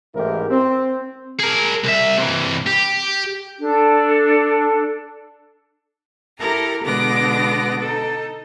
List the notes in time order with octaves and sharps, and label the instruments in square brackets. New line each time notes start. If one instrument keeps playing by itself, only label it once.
[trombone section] A1 G#2 E4 G4 A#4
C4
[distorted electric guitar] G#4 A#4
C2 E5
C3 E3
G4
[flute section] D4 A4
[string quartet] E4 G4 A4 A#4 A#5
B2 D3 G#3 B3 D6 A#6
D#4 A4